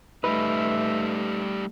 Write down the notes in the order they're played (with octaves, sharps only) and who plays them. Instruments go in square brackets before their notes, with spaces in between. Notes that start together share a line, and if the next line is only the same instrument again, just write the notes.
[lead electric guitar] G3 D#4 [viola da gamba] A3 [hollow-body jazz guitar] B4 [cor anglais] E5